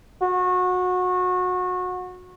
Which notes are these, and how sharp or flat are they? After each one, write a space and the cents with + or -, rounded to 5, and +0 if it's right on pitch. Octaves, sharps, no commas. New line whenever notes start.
F#4 -25